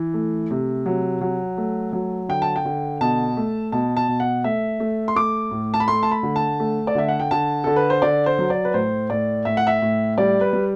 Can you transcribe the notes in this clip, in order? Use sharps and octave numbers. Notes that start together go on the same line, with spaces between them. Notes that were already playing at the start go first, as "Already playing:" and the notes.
Already playing: E3
A3
C3
F#3
F#3
A3
F#3
D3 G5
A5
G5
D3
B2 A5
A3
B2 A5
A5
B2
F#5
A3 E5
A3
C6
A3 D6
A2
A5
B5
A3 C6
A5
B5
D3
A5
A3
D5
D3 E5
F#5
G5
D3 A5
D3 A4
B4
C5
D3 D5
C5
F#3
D5
B4
A2 C5
A2 D5
A2 E5
F#5
E5
A2
G3 D5
B4
G3